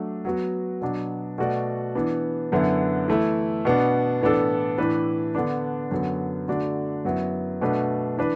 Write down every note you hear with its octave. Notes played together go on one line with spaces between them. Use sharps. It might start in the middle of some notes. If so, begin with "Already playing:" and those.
Already playing: F#3 A3 D4
F#3 B3 F#4
B2 F#3 B3 D4
B2 A3 F#4 D5
E3 B3 D4
F#2 D3 B3 E4
E3 A3 E4
B2 B3 D4
A2 E3 B3 D4 A4
A2 E3 D4 B4
D3 B3 D4
F#2 D3 F#3 B3
D3 A3 D4 F#4 D5
F#2 F#3 B3 E4
B2 A3 D4 B4
E3 D4 B4